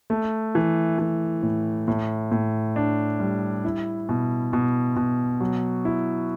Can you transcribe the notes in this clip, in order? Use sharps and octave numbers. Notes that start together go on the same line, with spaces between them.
A3
E3
E3
A2
A2
A2
D4
G3
E4
B2
B2
B2
F#3
E4